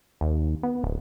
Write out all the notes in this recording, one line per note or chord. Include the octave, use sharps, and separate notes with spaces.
D#2
B3
D1